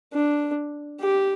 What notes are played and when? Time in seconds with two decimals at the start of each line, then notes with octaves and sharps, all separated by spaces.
0.13 D4
1.01 G4